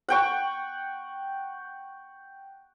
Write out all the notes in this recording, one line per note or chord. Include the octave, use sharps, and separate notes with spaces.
F#5 G5 C#6